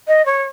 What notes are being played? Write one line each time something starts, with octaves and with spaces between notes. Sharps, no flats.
D#5
C#5